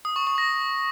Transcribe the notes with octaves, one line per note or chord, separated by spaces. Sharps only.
D#6
C#6
C#6
A#6